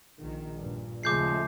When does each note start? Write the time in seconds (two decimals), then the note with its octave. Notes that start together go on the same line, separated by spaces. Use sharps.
0.23 A#1 D#3
0.59 G2 A#2
1.03 D#2 C#3 F3 G#3 A3 D6 G6 C7